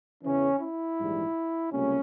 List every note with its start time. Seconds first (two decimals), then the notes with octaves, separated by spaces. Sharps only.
0.23 E2 C#3 E3 C#4
0.61 E4
0.98 A#1 G#2 E3 G3
1.72 C#2 C3 G3 A#3 C#4